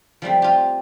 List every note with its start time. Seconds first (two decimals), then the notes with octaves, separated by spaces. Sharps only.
0.22 F3 G3 A3 C4
0.42 F4 G4